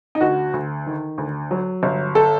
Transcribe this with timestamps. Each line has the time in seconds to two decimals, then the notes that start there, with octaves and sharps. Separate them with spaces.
0.15 D#4
0.21 D2 F#4
0.53 D2
0.86 D#3
1.18 D2
1.51 F#3
1.83 G1
2.15 A4